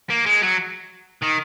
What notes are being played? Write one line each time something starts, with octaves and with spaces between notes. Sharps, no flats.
A#3
G#3
F#3
D#3